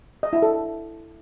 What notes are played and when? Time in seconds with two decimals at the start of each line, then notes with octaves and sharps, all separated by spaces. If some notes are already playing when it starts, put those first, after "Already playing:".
0.23 D#5
0.33 E4
0.42 A4